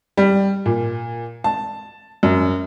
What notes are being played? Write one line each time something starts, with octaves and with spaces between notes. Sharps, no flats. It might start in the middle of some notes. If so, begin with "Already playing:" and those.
G3
A#2
A5
F#2